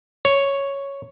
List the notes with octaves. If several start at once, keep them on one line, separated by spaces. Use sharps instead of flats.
C#5